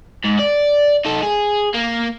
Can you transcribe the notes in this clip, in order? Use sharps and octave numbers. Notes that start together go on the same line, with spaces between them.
G#2
D5
D#4 A4
G#4
A#3